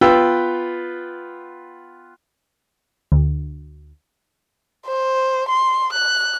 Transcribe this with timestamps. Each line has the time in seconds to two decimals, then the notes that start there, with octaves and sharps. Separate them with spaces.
0.01 B3 F4 B4 G5 E6
3.12 D2
4.86 C5
5.48 C6
5.92 F#6